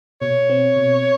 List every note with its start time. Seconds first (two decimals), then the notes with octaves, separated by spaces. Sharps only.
0.22 B2 C#5
0.50 C4
0.76 B2